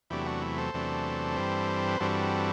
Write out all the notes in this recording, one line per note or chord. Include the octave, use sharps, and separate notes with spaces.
E2 C3 F#3 A3 D4 E4 G4
D4 F#4
E4
A4 C5
E2 C3 F#3 A3 D4
G2 E3 G3 C4
B4
G2 E3 G3 C4 F#4 A4